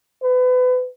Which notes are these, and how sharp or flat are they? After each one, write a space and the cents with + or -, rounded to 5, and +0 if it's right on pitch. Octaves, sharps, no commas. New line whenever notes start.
B4 +30